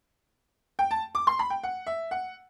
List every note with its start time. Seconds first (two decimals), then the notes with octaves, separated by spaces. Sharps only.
0.79 G5
0.91 A5
1.15 D6
1.27 C6
1.39 B5
1.50 G5
1.63 F#5
1.87 E5
2.11 F#5